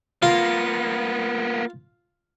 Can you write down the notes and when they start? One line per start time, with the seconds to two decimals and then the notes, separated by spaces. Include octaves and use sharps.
0.23 A#3 B3 F4